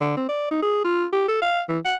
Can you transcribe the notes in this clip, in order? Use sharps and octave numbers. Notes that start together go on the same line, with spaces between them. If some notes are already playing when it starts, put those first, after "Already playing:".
D3
C4
D5
D#4
G#4
F4
G4
A4
F5
E3
F#5